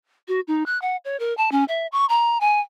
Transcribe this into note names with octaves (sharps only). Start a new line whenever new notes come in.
F#4
D#4
F#6
F#5
C#5
A#4
A5
C#4
E5
C#6
A#5
G#5